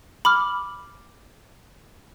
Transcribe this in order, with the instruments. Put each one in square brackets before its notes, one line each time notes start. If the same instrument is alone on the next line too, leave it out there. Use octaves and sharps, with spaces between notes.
[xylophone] B5 D6 F6